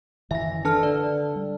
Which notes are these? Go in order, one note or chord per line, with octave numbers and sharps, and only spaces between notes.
F#1 D#3 E3 E5 A#6
D4 A4 B4 A5 F6
D3 D5
G3